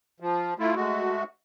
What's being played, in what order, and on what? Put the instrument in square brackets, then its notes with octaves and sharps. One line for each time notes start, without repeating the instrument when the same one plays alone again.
[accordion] F3
A3 E4 F4
G#3 A3 F#4